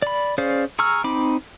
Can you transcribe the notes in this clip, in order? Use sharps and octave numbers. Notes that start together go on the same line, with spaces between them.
D5 B5
C#4 G#4 C5 D5 F5
G#4 A#5 C#6 E6 F6
C4 D#4 B5 D6